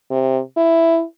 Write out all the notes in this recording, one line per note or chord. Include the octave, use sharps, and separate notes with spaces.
C3
E4